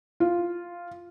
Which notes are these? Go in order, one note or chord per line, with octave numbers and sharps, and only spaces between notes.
F4